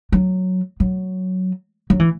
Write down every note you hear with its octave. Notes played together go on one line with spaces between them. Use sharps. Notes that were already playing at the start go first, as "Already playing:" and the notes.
F#3
F#3
F#3
E3